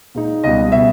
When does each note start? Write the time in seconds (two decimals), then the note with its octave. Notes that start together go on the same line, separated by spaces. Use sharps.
0.15 A#2 G#3 D#4
0.44 C#2 B2 G3 D#5
0.72 B2 G3 E5